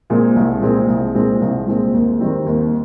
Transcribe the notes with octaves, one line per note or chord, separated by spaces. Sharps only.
A#2 G#3 C4
C2
A#2 G#3 C4
C2
A#2 G#3 C4
C2
A#2 G#3 C4
D#2
D#3 G3 C4
D#2